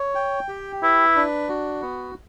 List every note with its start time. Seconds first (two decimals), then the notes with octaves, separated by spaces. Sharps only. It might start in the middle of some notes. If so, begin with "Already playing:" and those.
Already playing: C#5
0.15 G5
0.48 G4
0.83 E4 B4
1.16 D4
1.49 F#4
1.82 B3